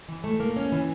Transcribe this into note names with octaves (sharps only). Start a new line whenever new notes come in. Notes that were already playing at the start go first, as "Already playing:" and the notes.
E3
A3
A#3
C#4
E3